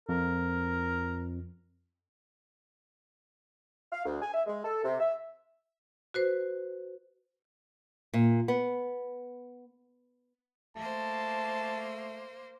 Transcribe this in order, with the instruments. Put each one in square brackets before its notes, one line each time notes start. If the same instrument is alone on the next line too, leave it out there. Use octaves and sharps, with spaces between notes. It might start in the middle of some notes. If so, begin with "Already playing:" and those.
[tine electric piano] F2 [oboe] A#4
[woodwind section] F5
D2
G#5
E5
G#3
A4
C3
E5
[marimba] F#4 B4 C5
[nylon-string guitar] A#2
B3
[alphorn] A3 [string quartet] A#3 C5 [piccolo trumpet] A5